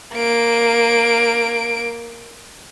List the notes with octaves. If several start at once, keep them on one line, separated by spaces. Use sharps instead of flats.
A#3 D7